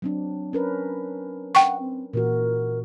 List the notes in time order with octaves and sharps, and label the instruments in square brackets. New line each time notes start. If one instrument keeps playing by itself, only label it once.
[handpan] F#3 C4 D4
C#4 A#4 B4
[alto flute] F#5 [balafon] G5 C#6
[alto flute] C4
[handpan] A#2 E3 F#4 [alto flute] A#4